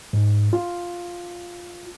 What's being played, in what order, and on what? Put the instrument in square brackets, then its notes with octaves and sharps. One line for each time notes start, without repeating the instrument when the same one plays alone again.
[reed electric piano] G#2
F4